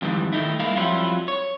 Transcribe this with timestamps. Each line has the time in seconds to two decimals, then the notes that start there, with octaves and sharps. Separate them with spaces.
0.02 F2 G#2 D#3 E3 G3
0.33 D#3 A3 D#4 E4
0.59 G3 G#3 A#3 E4 F5
0.76 F2 F#3 G3 E4 F4
1.28 C#5